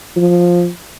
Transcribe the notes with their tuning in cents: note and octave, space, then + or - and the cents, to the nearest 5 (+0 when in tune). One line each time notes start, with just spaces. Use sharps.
F3 +10